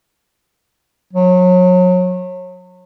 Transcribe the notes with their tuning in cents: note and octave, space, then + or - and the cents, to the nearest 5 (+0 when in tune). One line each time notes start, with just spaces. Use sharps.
F#3 -30